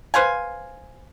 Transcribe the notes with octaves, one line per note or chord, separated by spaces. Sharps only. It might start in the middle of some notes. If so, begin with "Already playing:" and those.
B4 C5 F5 G#5